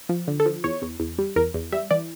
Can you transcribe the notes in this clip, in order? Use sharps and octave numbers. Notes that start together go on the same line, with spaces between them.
F3
D3
A4
F3
E2 C#5
E2
E2
G3
E2 A#4
E2
G3 E5
E3 D5